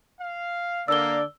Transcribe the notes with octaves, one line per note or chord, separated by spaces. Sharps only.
F5
D3 A#3 D5 E6 G7